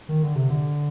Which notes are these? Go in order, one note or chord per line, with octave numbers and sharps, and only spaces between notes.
D#3
D3
C3
D3